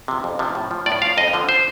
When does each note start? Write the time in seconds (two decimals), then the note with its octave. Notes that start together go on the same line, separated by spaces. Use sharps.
0.08 C3 F3
0.24 F2
0.39 C3 F3
0.55 A2
0.71 F3
0.86 A2 D5
1.02 F3 F5
1.17 F2 D#5
1.33 D3 F3
1.49 C5